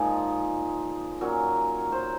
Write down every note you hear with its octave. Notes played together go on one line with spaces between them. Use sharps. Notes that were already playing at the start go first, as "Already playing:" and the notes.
Already playing: A#2 F3 G#3 D#4 G#4
A#2 F#3 C#4 A#4
C5